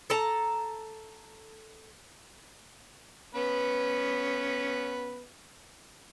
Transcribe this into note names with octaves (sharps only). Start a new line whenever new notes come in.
A4 A5 A#5
B3 C#4 B4